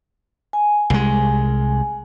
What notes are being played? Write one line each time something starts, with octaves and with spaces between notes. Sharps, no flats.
G#5
C2 G#3